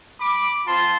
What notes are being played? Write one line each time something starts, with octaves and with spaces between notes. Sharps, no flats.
B5 D6
C4 F4 A5 C6